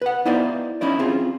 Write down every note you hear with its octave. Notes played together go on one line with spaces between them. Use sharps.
B4 F#5
B3 D#4 E4 C5 D5 F5
C#4 D#4 E4 D5
C4 C#4 F4 G#4